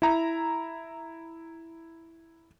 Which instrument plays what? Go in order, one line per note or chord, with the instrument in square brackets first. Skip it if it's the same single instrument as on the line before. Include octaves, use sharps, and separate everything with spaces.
[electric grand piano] E4 A#5